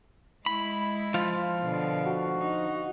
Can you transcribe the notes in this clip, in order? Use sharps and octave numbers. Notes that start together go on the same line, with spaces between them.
G#3 E4 B5
F3 F4
B2 D3
F#4
D#4